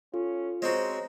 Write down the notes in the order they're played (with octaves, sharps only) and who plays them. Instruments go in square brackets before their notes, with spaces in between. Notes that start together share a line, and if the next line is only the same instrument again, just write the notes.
[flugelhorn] C#4 [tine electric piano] F4 [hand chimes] A4
[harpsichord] G#3 C4 F#4 [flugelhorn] C5 [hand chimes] C#5 D#5 A#5